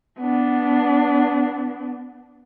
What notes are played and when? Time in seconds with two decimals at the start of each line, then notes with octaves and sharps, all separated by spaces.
0.19 B3 D4